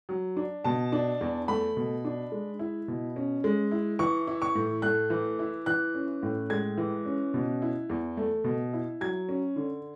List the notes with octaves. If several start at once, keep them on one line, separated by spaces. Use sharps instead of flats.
F#3
D4
B2 A5
D4
E2
A3 B5
B2
D4
G#3
E4
B2
C#4
G#3
E4
E3 C#6
E4
C#6
A2
A3 F#6
E3
E4
E3 F#6
C#4
A2
G#3 G#6
E3
C#4
B2
E4
E2
A3
B2
E4
F#3 G#6
C#4
D3